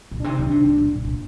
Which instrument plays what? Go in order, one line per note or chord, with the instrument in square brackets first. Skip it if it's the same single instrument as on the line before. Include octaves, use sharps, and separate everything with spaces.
[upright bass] A#2
[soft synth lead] D4
[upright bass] C3
[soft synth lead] D#4
[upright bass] D#3
[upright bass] C3 [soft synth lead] D4
[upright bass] G#2
A#2
A#2
A#2